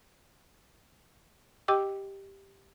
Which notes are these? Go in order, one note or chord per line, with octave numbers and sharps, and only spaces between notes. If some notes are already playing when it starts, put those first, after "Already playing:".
G4 D#5 G5 D6 E6